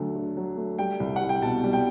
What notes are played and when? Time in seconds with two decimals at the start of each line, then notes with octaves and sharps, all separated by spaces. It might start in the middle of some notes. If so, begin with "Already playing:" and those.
Already playing: D2 F#3 A3
0.15 D3
0.37 F#3
0.57 A3
0.79 G3 G5
1.00 C2
1.16 F#5
1.21 C2
1.29 G5
1.42 B2 A5
1.64 G3
1.73 G5